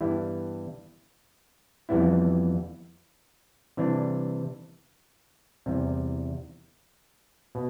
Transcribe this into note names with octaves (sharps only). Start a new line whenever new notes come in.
G2 E3 G3 B3 E4
F2 E3 G3 B3 E4
C3 E3 G3 D4
E2 C3 G3
B2